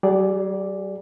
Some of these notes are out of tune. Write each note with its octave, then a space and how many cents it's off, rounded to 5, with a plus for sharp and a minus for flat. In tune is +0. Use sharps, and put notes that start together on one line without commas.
G3 -45 G#4 +0 D5 +0